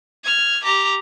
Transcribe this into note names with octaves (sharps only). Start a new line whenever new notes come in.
F6 G#6
G4 A#5